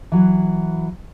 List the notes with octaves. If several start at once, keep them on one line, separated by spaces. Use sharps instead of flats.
E3 F#3